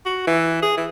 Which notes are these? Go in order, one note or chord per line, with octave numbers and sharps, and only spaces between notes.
F#4
E3
G#4
E3